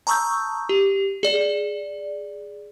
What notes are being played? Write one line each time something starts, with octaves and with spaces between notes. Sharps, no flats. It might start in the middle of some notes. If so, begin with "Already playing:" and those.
A5 A#5 C#6 D#6 E6 G6
G4
G#4 D5